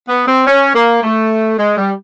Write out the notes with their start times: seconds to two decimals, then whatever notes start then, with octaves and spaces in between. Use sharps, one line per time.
0.09 B3
0.28 C4
0.47 C#4
0.75 A#3
1.03 A3
1.58 G#3
1.78 G3